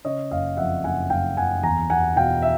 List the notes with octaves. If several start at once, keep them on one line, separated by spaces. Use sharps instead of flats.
C#3 C#5 D#5
F#1 D#5 F5
F2 E5 F#5
F#1 F#5 G#5
F#1 F5 G5
F#1 F#5 G#5
E2 G#5 A#5
E2 F#5 G#5
B2 F5 G5
E5